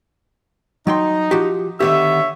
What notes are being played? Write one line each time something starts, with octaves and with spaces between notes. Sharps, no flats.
F#3 D#4 G5 C6
F3 F#4 G4
D3 D#3 B3 G4 C#5 E5